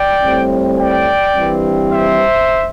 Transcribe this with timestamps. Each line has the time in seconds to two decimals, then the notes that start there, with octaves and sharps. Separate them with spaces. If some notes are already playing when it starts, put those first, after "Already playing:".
Already playing: D5 G5
0.22 A2 G3 C4
0.78 D5 G5
1.35 G2 E3 G3 C4
1.90 C5 E5